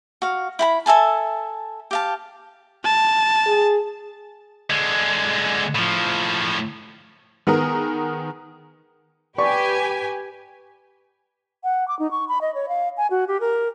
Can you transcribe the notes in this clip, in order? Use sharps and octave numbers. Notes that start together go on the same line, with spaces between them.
F#4 F5
E4 G5 B5
A4 E5 G#5 A5
G4 F5 A5
A5
G#4
D3 G#3
A2 F3
D#3 B3 G#4 A#4
G4 B4 D5 G#5 C#6
F#5
D6
D#4
C#6
B5
D#5
C#5
F5
G#5
F#4
G4
A#4